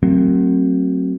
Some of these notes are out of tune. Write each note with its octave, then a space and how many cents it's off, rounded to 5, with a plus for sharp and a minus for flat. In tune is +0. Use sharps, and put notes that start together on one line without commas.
F#3 +15 A3 +45 C4 +25